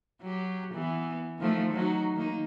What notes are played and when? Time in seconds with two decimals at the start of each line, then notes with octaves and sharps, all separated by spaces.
0.21 F#3 G4
0.74 E3 B3
1.38 D#3 F3 A3
1.73 F#3 D#4 F#4
2.16 D#3 A#3 D#4